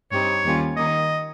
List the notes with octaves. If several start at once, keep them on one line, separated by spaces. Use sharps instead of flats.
G2 G3 C4 D#4 C#5
D#2 D#3 G3 C#4 F4
D#3 A#3 D#4 D#5